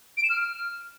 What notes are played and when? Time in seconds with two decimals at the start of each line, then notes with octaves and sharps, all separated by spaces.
0.17 D7
0.23 E7
0.30 F6